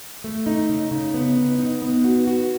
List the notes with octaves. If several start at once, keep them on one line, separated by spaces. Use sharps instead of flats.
A3
D#4
C#3
C#3
B3
D#4
D#4
B3
F#4
F#4